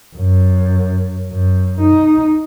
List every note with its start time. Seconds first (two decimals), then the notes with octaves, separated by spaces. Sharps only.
0.16 F#2
1.28 F#2
1.80 D#4